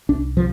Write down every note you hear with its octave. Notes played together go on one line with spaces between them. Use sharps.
C2 D4
C3 F3